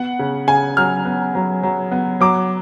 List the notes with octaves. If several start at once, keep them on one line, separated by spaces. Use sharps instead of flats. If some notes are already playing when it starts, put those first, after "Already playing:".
Already playing: B3 F#5
C#3
C#3 G#5
F#3 F6
B3
F#3
F#3
B3
F#3 D6